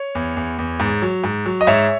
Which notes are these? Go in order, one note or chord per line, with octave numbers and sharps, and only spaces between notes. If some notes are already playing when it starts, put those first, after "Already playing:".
Already playing: C#5
E2
E2
E2
G#2
F#3
G#2
F#3
D#5
G#2 C#5 E5